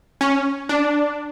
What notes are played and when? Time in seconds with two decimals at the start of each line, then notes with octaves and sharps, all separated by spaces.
0.21 C#4
0.69 D4